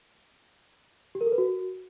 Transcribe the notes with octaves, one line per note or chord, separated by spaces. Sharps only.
G4
A#4
A4
B4
F#4